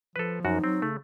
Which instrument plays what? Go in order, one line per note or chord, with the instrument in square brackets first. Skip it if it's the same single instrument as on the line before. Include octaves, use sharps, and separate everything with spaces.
[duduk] F3 [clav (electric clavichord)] A4 B4
[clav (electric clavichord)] F#2 F#4 A#4 [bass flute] D#4
[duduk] F#3 [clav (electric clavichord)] C4
[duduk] C#3 [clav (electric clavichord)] A3